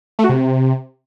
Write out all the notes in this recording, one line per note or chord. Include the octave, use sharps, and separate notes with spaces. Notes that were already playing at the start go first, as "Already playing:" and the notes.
A3
F#4
C3